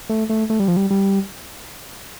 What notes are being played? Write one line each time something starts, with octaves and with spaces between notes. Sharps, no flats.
A3
A3
A3
G3
F3
G3
G3